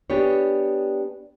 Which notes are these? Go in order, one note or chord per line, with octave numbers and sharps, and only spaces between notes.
B3 D4 G4 G#4 C#5